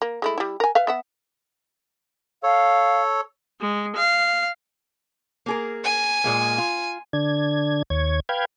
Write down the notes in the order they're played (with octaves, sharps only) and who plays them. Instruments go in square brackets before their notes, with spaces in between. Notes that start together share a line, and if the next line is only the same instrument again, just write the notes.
[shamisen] A#3
G#3 A3 E4
G3 E4
A#4 G#5
B4 E5 F5
B3 E5 F#5
[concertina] A4 C#5 [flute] F5
[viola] G#3
F5
[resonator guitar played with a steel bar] A#3 G#4 A#4
[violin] G#5
[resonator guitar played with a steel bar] A#2 G#3 A#3
F4
[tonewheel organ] D3 D4 G#6
D#2 C#5 G#6
B4 F5 G5 G#6